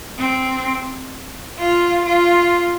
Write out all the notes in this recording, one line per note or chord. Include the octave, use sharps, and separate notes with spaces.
C4
F4
F4